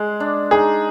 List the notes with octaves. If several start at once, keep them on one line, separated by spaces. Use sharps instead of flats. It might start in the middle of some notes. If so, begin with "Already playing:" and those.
Already playing: G#3
D4
D#4 G#4